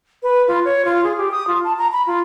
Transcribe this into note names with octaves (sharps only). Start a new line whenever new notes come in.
B4
F4
C#5
F4
G#4
G4
D#6
F4
A5
A#5
B5
F4